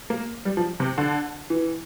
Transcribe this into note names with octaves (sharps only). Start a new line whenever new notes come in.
A#3
G3
F3
C3
D3
E3